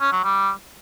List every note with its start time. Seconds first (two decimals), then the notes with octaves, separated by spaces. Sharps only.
0.01 C#4
0.12 F#3
0.24 G3